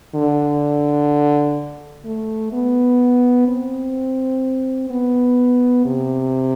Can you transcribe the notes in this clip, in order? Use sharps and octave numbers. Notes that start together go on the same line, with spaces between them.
D3
A3
B3
C4
B3
C3